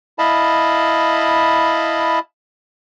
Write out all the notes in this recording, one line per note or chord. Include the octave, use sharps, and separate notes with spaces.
E4 D#5 F5 A5 B5